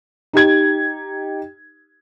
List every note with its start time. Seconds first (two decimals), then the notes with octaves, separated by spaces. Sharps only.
0.33 D#4 G4 G#6